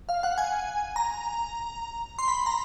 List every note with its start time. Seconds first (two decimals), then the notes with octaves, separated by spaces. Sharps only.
0.09 F5
0.23 F#5
0.38 G#5
0.96 A#5
2.19 C6
2.28 B5
2.46 A#5